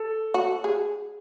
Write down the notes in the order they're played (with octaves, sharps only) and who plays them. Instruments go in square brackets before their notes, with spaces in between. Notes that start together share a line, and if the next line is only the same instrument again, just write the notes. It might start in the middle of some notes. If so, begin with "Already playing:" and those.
Already playing: [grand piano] A4
[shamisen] F#4
G#4